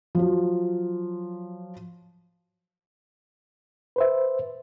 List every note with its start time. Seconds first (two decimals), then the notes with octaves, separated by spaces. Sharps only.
0.15 F3 F#3
3.96 B4 C5 E5